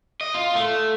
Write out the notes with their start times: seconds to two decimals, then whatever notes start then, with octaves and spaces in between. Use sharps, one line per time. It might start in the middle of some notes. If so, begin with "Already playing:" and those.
0.21 D#5
0.34 F4
0.55 A3